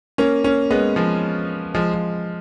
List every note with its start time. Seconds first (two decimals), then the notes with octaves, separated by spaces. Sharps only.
0.18 A#3 C#4
0.44 A#3 C#4
0.70 G#3 B3
0.96 F3 G#3
1.74 F3 G#3
1.94 F3